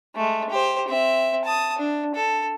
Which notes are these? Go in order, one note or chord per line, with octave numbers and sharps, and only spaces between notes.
G#3 A3
G4 C5
C4 E5
A5 D#6
D4
A4